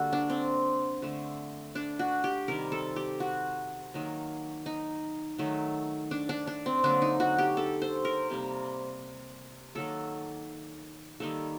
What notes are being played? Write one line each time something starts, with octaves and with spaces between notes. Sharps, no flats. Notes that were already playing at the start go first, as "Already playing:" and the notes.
Already playing: D3 G3 A#3 F#4 A4
D4
C4
D3 A3
D4
F#4
G4
C3 D#3 G3 A#4
A4
G4
F#4
D#3 F#3 A#3
D#4
D#3 F#3 A3
D4
D4
D4
C4
D3 F#3 A#3 D4
D#4
F#4
G4
A4
C5
A#4
C3 G3 A#3
D#3 F#3 A#3 A4
D#3 G3 A#3 A4